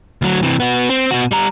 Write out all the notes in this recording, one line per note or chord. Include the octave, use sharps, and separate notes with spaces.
D2 F#3
C3 E3
B3 F#4
C4
B2 F#4
G3 A#5